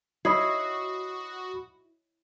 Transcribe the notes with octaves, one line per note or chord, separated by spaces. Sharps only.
E4 F#4 C#5 D#5 B5 D#6 C7